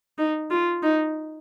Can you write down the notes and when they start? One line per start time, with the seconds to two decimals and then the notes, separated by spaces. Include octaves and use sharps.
0.18 D#4
0.51 F4
0.83 D#4